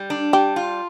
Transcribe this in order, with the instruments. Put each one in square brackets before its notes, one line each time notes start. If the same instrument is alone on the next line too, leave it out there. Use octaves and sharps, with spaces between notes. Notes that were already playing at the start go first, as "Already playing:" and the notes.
Already playing: [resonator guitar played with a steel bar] G3
D4
[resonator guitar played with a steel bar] G3 [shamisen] G4
[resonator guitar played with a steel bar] F4